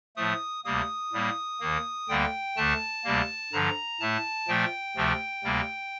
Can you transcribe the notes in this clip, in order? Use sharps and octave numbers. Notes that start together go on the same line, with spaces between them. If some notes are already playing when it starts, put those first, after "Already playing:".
A2 F3 A3 D#6
D2 C3 G3 A#3 D#6
A2 G3 A#3
D#2 D#3 A#3
D2 D3 G3 A#3 G5
D2 D3 A3 A5
D2 C3 G3 A#3
G2 D3 F3 A#5
A2 A3 A5
A#2 F3 A3 G5
D2 C3 F3 A3
D2 C3 G3 A#3